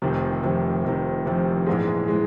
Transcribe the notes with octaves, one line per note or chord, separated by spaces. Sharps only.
F1 F2 C3 D#3
F1 F2 C3 D#3
F1 F2 C3 D#3
F1 F2 C3 D#3
A#1 G#2 E3 G#3
E3 G#3